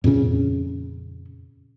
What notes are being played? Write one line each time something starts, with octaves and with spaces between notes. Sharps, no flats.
F2 A#2 C#3 C#4